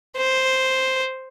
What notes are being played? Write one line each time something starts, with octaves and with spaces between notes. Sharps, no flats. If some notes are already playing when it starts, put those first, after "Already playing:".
C5